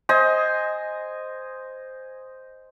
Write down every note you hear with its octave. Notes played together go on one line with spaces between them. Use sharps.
C5 D#5 G#5